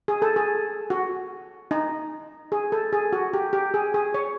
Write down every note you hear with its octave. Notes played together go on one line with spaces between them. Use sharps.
G#4
A4
G#4
F#4
D#4
G#4
A4
G#4
F#4
G4
G4
G#4
G#4
C#5